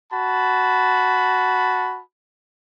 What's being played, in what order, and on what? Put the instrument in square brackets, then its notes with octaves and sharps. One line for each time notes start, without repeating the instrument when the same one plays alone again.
[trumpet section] F#4 A5 B5